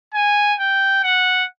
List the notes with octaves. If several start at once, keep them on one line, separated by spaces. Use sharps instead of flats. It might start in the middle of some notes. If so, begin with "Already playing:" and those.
G#5
G5
F#5